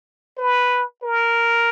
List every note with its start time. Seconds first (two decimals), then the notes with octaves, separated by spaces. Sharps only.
0.38 B4
1.03 A#4